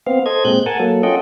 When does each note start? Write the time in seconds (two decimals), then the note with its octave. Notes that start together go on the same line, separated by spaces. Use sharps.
0.06 B3 C4 F5
0.26 A4 C5 D#5 G#6
0.45 A#2 G#3 C4 F#6 G6
0.66 A#4 F#5 G#5 A5
0.79 F#3 A#3 A4
1.03 C#4 F4 A4 D#5 F#5 G5